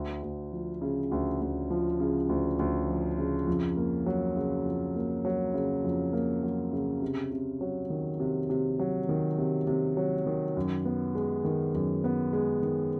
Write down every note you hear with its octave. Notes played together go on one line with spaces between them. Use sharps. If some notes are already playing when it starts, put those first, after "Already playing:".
Already playing: D2
D2
F3
C#3
D2
D2
F3
C#3
D2
D2
F3
C#3
F2
A#3
F#3
C#3
F2
A#3
F#3
C#3
F2
A#3
F#3
C#3
C3
C3
F#3
D#3
C3
C3
F#3
D#3
C3
C3
F#3
D#3
F#2
B3
G#3
D#3
F#2
B3
G#3
D#3